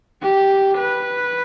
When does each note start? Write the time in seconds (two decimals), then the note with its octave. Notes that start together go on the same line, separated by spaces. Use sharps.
0.22 G4
0.78 B4